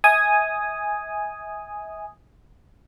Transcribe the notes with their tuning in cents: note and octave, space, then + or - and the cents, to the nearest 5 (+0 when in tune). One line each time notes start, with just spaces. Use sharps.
E5 -40 G#5 +0 D#6 +0